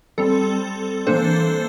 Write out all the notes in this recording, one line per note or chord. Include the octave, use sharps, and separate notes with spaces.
G3 C4 A4
E3 A#3 D4 A4 C5